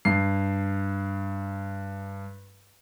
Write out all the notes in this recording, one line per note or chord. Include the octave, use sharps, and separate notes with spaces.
G2 C7